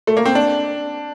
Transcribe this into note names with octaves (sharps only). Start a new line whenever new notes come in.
A3
A#3
C4
D4